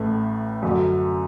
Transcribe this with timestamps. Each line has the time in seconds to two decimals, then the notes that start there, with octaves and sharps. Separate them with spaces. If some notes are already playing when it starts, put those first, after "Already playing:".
Already playing: A1 A2 A3
0.62 F#2 D3 F#3